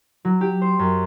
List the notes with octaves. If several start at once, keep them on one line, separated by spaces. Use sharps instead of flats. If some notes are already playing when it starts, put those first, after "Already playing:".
F#3
G4
C5
F#2